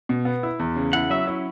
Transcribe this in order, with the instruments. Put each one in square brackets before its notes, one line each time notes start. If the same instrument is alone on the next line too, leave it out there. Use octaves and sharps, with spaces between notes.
[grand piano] B2
B3
E4
E2
C#3
[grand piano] E4 [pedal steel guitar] F#5
[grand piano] F#3 [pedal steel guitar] E5
[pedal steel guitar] C#4 [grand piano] E4